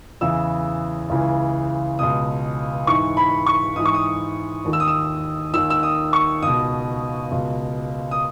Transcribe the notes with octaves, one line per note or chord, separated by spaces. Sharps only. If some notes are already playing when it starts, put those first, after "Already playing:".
E2 C#3 E3 E6
C#2 C#3 E3
C#2 B2 D#6
G#2 E3 C#6
B5
C#6
G#2 E3 D#6
C#6
D#6
D#2 D#3
E6
D#6
E6
D#2 D#3 E6
E6
D#6
C#6
C#2 B2 D#6
C#2 B2
D#6